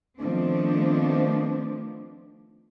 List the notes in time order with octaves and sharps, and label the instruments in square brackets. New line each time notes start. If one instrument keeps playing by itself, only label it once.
[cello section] D#3 F3 A3 B3 C4 D4